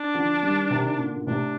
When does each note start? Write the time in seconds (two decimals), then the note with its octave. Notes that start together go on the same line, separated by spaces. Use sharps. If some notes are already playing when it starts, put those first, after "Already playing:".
Already playing: D4
0.14 D3 F3
0.43 D#3 G3
0.70 C3 D#3
0.98 A#2 D3
1.15 A#2
1.27 A2 C3 D4